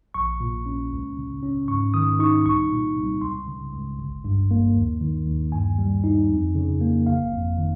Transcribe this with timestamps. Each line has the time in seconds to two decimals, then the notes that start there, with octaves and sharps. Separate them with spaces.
0.14 A#1 C#6
0.40 A#2
0.66 C#4
0.91 C#2
1.17 C#3
1.42 C#4
1.68 G#2 C#6
1.94 D#3 D#6
2.19 D#4 C#6
2.45 C2 C#6
2.71 A#2
2.97 C2
3.22 C#2 C6
3.48 C#3
3.73 C#2
3.99 G1
4.25 G2
4.51 A#3
4.76 D#2
5.01 D#3
5.27 D#2
5.52 G2 G#5
5.78 G3
6.04 D#4
6.30 F2
6.55 C#3
6.81 A#3
7.06 G1 F5
7.32 F2
7.57 D#3